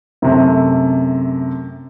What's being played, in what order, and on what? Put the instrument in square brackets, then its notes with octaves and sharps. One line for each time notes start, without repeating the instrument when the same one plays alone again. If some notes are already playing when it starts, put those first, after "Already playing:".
[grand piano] F#2 C3 A3